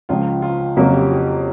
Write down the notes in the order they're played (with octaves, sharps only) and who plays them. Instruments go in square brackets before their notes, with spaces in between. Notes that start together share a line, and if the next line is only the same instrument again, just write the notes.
[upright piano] C#2 C#3 F3 [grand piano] F4
[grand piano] F4
[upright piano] F2 C#3 F#3 A#3 C#4 [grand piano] F#4
[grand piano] G4
F#4